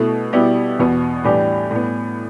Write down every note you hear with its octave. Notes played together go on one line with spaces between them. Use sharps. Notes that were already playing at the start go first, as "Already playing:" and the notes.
Already playing: B2 A3 E4
B2 G3 B3 E4 G4
E2 B2 B3
A2 E3 G3 D4 G4
A2 G3 B3